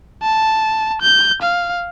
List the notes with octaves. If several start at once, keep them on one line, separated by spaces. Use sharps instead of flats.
A5
G6
F5